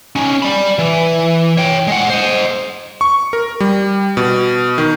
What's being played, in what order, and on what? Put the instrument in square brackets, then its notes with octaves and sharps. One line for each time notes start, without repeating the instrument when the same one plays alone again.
[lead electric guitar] C#4 D#4
D5 B5
E3
C#5 G5
G#3 F#5
C5 D#5
[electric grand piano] C#6
A#4
G3
B2
D#3